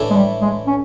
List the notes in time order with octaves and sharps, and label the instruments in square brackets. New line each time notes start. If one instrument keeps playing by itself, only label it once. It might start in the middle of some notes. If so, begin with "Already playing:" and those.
Already playing: [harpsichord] A2 E3 A3 D4
[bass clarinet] G#3
G3
G#3
C#4